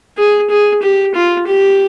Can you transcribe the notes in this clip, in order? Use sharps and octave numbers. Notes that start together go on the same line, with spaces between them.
G#4
G#4
G4
F4
G4